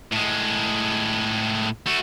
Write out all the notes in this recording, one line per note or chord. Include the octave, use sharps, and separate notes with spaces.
A2 G#3
A3 F#4